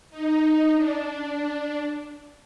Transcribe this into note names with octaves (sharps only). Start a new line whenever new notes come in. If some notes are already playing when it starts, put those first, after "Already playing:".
D#4
D4